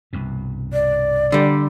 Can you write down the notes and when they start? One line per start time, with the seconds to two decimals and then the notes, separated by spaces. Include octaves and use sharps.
0.13 C2 G2 B2
0.73 D5
1.32 D3 G3